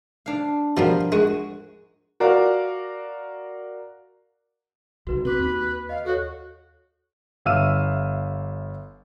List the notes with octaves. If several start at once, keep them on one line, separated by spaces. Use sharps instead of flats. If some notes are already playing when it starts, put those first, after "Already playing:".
D4 F5
B2 F3 G3 A#4 F5
G#3 F#4
F#4 A#4 D5 F5
B1 C3 F#4 B4
C4 F#4 B4 D6 B6
D#2
D#5 F5
F#4 A4 C#5
G1 E5 F5 E6 F6 D#7